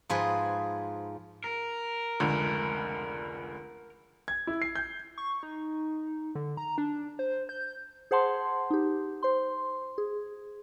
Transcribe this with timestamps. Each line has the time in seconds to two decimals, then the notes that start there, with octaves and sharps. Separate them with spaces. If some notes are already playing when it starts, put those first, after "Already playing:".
0.09 G#2 F3 G#4 B4
1.44 A#4
2.20 F1 C#2 D3
4.28 G#6
4.47 E4
4.62 C7
4.75 G6
5.18 C#6
5.43 D#4
6.35 D3
6.57 A#5
6.78 D4
7.19 C5
7.49 G6
8.11 G#4 C5 F#5 A5 C6
8.70 D#4 G4
9.23 C5 C6
9.98 G#4